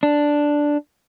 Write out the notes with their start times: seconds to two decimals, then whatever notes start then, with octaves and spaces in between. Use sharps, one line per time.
0.03 D4